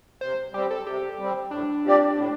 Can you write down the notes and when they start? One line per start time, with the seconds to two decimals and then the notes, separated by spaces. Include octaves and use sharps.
0.21 C3 C5
0.54 G3 C4 G4
0.70 A4
0.86 C3 G4
1.19 G3 C4
1.51 A2 D4
1.84 F3 C4 G4 D5
2.16 A2